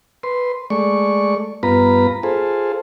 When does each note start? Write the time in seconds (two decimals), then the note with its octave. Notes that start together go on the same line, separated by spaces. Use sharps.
0.23 B4 C6
0.70 G#3 A3 D5 C#6
1.63 G2 B3 F4 B4 A#5 B5
2.23 F4 G#4 A4 C5